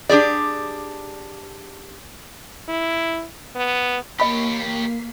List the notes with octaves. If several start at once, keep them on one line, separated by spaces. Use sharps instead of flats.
D4 G4 G#4 D5
E4
B3
A#3 G4 C#5 D#5 B5 B6 C7